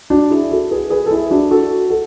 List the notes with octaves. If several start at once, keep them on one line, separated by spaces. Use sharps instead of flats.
D4 F#4
E4 G#4
F#4 A4
G#4 B4
G#4 B4
A4
E4 G#4
D4 F#4
F#4 A4
A4